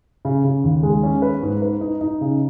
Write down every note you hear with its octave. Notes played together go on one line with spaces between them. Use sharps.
C#3
C#3
D#2
G#3
C#4
B4
G#2
B4
D#4
D#4
C#3